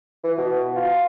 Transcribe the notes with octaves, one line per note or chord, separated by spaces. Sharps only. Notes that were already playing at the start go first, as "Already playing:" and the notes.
E3
B2
F4